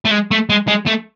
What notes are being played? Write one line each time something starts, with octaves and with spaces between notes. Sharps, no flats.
A3
G#3
A3
G#3
G#3
A3